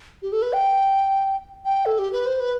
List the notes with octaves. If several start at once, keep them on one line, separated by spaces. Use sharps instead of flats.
G4
A4
B4
G5
G5
A4
G4
B4
C5
B4